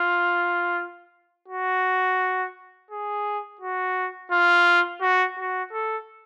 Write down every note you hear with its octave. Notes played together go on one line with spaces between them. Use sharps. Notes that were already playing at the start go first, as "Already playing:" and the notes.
Already playing: F4
F#4
G#4
F#4
F4
F#4
F#4
A4